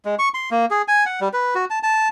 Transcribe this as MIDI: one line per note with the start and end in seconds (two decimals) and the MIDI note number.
0.05 0.15 56
0.19 0.29 85
0.34 0.50 84
0.51 0.66 58
0.71 0.82 68
0.88 1.05 80
1.06 1.20 78
1.21 1.28 55
1.33 1.54 71
1.55 1.65 66
1.70 1.79 81
1.83 2.08 81